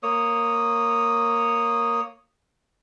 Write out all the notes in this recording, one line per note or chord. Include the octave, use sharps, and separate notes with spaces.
A#3 C#5 D#6